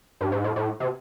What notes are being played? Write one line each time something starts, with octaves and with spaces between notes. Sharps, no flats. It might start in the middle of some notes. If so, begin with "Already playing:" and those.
G2
G#2
A2
A2
C3